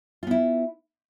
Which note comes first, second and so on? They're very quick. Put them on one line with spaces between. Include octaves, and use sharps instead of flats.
F4 B3 E4